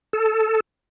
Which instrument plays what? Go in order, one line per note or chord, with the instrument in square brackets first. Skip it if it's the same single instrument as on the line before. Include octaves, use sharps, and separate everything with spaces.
[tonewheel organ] A4